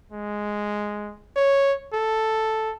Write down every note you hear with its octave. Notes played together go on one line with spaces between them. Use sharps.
G#3
C#5
A4